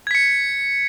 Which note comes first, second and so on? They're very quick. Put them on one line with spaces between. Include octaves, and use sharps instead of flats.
G#6 B6 C#7